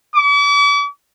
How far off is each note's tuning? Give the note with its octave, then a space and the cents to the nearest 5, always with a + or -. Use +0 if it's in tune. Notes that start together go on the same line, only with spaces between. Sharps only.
D6 -45